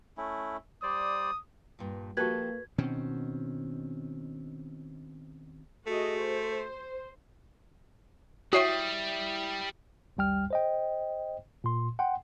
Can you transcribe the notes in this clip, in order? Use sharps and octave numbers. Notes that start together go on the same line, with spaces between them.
A3 C#4 E4
G3 C5 D5 D#6
G2 A#2
F3 A#3 F#4 G4 A4 B4 G#6
B2 D#3 C4 C#4
A3 F#4 G#4 D#5
C5
G3 E4 F#4 C#5 E5 G5 D#6 C7
G#1 D2 G3 G5 F6
C5 D#5 G5
A#2 C6
F#5 G5 C6